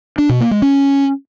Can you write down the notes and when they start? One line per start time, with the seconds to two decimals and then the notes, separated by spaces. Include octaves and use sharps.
0.18 D4
0.29 B2
0.40 A#3
0.51 G#3
0.62 C#4